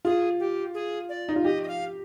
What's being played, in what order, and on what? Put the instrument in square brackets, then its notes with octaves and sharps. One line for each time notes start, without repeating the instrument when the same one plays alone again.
[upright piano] F4 [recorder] G#4
[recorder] G4
G#4
D5
[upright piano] D#4
F4
[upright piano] G4 [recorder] D#5
[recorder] D#5
F5